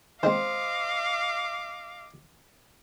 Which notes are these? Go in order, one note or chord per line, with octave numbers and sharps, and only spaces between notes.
D#3 G#3 C4 C5 D#5 F5 D6